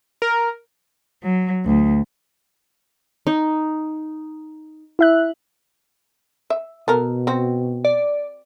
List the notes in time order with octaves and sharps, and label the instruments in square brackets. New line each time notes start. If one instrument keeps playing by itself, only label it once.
[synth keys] A#4
[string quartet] F#3
D2
[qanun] D#4
[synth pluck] E4 E5 F#6
[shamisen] E5
[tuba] B2 [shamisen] B3 A4 A#4
[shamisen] C4 F#4
[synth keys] D5